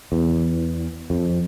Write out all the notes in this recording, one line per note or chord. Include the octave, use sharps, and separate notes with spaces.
E2
F2